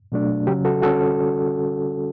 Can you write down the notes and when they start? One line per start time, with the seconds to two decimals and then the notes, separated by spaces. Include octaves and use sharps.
0.12 B2 F#3 A3 D4
0.47 C#3 F#3 C#4 G4
0.65 F#4 A4
0.82 D3 G3 C#4 F#4 A4